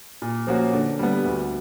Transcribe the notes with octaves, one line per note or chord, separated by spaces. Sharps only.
A#2
F3 A#3 C#4 F#4
D3
G3 B3
D2